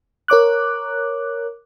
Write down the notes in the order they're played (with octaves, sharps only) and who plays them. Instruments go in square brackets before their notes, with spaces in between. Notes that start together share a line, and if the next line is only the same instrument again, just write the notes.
[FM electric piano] A#4 C#5 D6 F#6